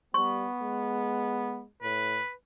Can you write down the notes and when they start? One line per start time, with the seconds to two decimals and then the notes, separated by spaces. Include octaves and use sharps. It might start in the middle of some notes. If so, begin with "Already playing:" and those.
0.14 G3 B3 C#6
0.62 G#3
1.83 A2 B4